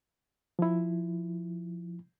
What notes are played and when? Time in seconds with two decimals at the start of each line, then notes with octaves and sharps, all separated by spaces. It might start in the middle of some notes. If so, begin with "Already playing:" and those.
0.59 F3 E4